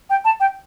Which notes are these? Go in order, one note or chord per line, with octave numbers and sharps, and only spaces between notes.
G5
A5
G5